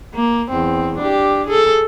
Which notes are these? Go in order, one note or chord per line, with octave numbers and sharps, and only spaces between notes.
A#3
E2 C4
D4 G4
G#4 A4